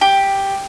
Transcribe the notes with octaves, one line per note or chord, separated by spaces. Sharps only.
G4